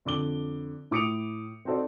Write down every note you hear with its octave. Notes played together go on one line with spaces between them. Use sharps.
F2 D3 D6 G7
A2 D6 D#6 C#7 D7 F7
C4 D#4 F#4 A4 C5 D5